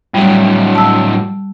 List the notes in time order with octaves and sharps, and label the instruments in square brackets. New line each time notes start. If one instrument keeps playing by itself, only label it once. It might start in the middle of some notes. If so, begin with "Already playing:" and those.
[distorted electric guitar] A2 F#3 [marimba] G3
[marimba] A5 E6